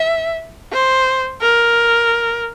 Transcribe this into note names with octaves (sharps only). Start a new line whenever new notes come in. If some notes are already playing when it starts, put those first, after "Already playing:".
Already playing: E5
C5
A#4